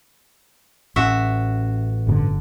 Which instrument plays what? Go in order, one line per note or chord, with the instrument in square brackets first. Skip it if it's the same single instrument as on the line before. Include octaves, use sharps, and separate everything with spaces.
[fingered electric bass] A1 C#4 [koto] F#4 E5
[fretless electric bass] G1 A#2 D3